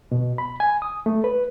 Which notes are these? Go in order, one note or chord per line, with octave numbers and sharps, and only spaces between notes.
B2
B5
G#5
D#6
A3
B4